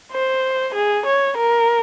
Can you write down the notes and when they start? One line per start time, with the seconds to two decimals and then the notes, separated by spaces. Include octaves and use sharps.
0.12 C5
0.74 G#4
1.06 C#5
1.37 A#4